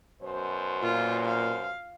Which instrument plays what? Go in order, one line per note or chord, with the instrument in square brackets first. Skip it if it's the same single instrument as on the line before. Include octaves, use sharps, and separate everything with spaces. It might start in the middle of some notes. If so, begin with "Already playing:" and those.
[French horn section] F#2 B2 C5
[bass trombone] A#2 [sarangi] F4
[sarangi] F5